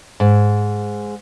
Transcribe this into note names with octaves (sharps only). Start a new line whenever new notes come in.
G#2